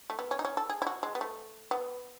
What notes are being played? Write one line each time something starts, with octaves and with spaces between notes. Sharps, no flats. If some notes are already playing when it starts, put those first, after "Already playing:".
A3
B3
C#4
D#4
C#4
A4
G#4
E4
F#4
G#3
B3
A3
B3